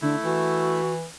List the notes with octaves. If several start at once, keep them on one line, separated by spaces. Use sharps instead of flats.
D3 A3 E4
E3 F#4